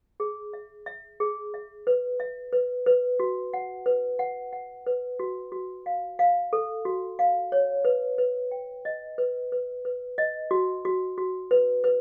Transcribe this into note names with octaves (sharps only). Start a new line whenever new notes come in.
G#4
E5
E5
G#4
E5
B4
E5
B4
B4
F#4
F#5
B4
F#5
F#5
B4
F#4
F#4
F5
F5
A4
F#4
F5
C#5
B4
B4
G5
D#5
B4
B4
B4
D#5
F#4
F#4
F#4
B4
B4